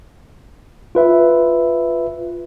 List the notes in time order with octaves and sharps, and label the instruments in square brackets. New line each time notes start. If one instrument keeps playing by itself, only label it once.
[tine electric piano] F4 B4 E5